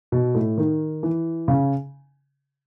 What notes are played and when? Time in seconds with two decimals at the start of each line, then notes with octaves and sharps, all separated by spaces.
0.12 B2
0.35 A2
0.58 D#3
1.03 E3
1.48 C#3